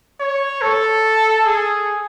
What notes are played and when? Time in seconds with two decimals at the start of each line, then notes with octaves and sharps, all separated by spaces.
0.20 C#5
0.62 A4
1.46 G#4